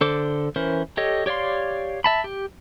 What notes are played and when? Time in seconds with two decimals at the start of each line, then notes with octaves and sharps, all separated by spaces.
0.01 D3 A4 C5 D6
0.56 E3 C#4 A#4 C5
0.97 G4 A4 C#5 D#5
1.26 G4 C#5 D5 F5 C6
2.04 E5 A5 B5
2.24 G4